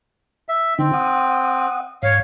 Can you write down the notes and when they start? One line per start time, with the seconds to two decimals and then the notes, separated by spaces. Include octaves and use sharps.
0.49 E5
0.79 D3 C4 D#4
0.94 F#5 D#6
2.03 G#2 C#5 F5